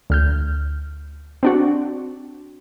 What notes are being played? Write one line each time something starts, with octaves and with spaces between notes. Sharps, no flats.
D2 F6 G6
C4 D4 F#4